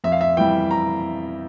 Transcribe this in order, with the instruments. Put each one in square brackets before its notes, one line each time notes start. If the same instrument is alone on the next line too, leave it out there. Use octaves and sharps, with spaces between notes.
[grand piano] F2 E5
F5
E5
E3 G3 G5
A#5